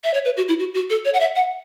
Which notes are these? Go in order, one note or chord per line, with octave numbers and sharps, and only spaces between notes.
E5
C#5
B4
F#4
E4
F#4
F#4
A4
C#5
F#5
E5
F#5